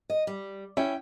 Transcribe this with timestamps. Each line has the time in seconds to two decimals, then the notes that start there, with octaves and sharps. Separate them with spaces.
0.10 D#5
0.27 G3
0.77 C#4 E4 G5